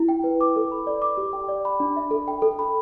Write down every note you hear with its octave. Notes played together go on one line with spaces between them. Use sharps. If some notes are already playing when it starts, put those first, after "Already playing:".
Already playing: E4
G5
B4
D6
A4
B5
D5
D6
G4
G5
D5
B5
D4
E5
A4
G5
A4
B5